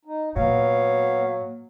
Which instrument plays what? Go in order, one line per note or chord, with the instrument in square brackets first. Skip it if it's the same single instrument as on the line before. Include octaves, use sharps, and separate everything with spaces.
[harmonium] D#4
[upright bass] A#2 [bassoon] F#3 [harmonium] B3 F5